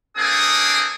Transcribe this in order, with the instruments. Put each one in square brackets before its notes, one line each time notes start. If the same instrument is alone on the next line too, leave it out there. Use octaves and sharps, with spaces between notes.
[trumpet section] A#3 C4 D4 G#4 A4 D#6